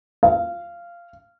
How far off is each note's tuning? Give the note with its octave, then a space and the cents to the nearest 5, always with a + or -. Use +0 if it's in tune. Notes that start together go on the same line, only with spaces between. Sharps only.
F5 -15